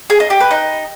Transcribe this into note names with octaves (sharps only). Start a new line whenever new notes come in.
G#4
D#4
G4
B4
D#4